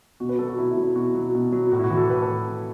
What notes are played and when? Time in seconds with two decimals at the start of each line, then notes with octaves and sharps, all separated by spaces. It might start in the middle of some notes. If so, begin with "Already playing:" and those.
0.20 B2 F#4
0.29 B4
0.38 F#3 A4
0.49 F#4
0.58 B2 E4
0.71 E4
0.77 F#3
0.83 E4
0.95 B2 F#4
1.15 F#3
1.35 B2
1.52 F#3
1.72 A2 F#4
1.79 E4
1.84 F#4
1.90 E3
1.97 A4
2.10 A2 B4
2.22 A4